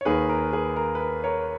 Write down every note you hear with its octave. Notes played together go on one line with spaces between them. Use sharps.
C#5
D#2 D#3 A#3 G#4 B4
A#4
G#4 B4
A#4
B4
A#4
A#4 C#5